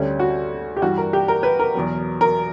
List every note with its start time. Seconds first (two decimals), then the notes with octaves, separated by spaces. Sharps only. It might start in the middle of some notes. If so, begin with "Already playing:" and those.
Already playing: D2 D3 G3 C#4
0.20 F#4
0.77 G4
0.82 G2 E3 G3 F#4
0.98 A#4
1.13 G4
1.28 A#4
1.43 B4
1.59 A#4
1.75 E2 B2 F#3
2.21 A#4